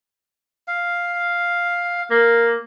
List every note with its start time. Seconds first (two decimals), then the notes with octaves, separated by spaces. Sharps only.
0.68 F5
2.10 A#3